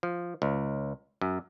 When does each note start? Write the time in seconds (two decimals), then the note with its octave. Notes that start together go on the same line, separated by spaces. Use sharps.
0.03 F3
0.42 C#2
1.21 F#2